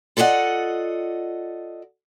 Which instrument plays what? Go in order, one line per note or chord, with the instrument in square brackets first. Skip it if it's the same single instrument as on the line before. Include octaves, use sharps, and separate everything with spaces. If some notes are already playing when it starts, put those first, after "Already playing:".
[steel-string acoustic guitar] F4 A4 D5 D#5 F#5